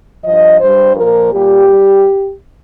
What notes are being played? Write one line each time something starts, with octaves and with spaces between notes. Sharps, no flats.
G2 F3 D#5
G2 G3 C5
A#2 F3 A#4
A#2 G3 G4
G3